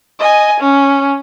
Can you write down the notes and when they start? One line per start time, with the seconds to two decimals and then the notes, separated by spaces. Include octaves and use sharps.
0.20 D#5 G#5
0.60 C#4